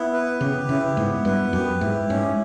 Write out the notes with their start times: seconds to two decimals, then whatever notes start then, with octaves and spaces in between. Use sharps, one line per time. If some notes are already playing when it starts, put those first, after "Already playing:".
Already playing: B3 E4
0.13 B4
0.41 C#3 G4
0.69 C#3 E4
0.97 G#2 B3
1.25 G2 B4
1.53 F#2 G4
1.81 G#2 E4
2.09 G#2 C#4